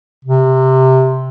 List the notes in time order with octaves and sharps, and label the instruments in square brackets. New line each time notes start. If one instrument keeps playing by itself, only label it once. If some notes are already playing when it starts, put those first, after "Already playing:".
[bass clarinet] C3